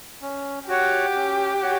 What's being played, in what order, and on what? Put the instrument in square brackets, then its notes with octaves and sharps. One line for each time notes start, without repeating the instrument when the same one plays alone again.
[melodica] C#4
[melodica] F#4 C#5 F#5 [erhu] G4
[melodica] C#4
F#4 C#5 F#5